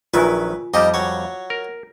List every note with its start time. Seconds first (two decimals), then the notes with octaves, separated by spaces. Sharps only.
0.14 A#1 D#3 F#3 F4 B4 E5 G#5
0.74 F2 G3 D#4 G4 D#5
0.94 F#3 C#5
1.50 A#4